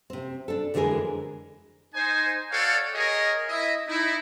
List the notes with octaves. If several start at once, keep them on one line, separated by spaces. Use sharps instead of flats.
C3 C4
D4 A4
F2 D3 E3 G#3 G#4 A#4
D#4 C5 G#5
F#4 A4 C#5 D5 F5 G5
G#4 A#4 C#5 D#5
E4 D#5 E5
D#4 E4